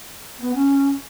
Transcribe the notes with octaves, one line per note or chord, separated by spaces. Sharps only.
B3
C#4